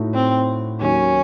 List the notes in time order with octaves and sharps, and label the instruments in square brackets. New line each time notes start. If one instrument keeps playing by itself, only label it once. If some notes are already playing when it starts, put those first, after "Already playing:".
Already playing: [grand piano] A2 A3 D#4 F#4
[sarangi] C4
[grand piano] D#2 D#3 F#3 [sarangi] C#4